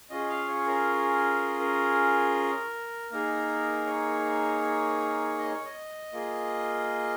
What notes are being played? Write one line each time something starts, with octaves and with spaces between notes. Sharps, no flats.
C#4 F4 G#4 D#5
F5
C#5
A#4
A#4
A#3 D#4 G#4 A#4
C#5
D#5
C#5
D#5
A#3 F4 G#4